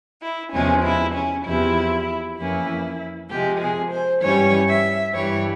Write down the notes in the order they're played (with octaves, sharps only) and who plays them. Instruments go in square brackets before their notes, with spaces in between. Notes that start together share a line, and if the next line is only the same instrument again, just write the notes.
[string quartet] E4
E2 C3 F3 G#3 C#4
E4
C#4
E2 C3 F3 E4
F2 E3 A#3 C#4 E4
C3 F3 G#3 G4
G#4
C5
G2 E3 G3 C#4 C#5
E5
G2 E3 G3 C#5